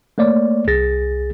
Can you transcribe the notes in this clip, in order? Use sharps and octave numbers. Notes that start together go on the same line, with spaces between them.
A3 A#3 C#5 D5
C2 G#4 A6 A#6